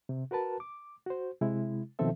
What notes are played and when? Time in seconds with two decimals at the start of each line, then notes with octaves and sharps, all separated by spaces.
0.09 C3
0.31 F#4 A#4 B4 A5
0.60 D6
1.06 F#4 C5
1.41 C3 G#3 E4
1.99 B2 D#3 F3 C4 A4 E5